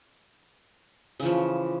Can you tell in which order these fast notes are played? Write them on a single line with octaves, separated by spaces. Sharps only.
C#3 E3 F3